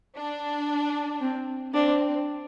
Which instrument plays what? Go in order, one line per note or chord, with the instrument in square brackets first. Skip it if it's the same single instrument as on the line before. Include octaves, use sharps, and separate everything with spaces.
[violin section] D4
[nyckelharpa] C4
[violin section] C4 [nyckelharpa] D4